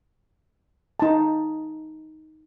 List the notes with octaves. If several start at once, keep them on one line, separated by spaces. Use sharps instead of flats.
D#4 A5